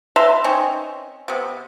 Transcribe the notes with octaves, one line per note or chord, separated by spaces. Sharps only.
B4 E5 A#5 C6
C4 C#4 D#4
C3 B3